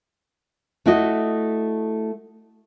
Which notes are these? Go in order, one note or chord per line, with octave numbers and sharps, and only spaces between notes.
A3 E4 F#4 D#5